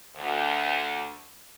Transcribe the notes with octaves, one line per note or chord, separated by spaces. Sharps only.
D2